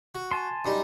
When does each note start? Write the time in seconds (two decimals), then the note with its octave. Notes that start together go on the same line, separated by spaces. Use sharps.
0.15 F#4
0.31 G#5 A5 C6
0.65 F#2 G3 D#4